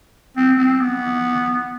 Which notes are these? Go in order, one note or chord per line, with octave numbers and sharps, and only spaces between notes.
C4
C4
B3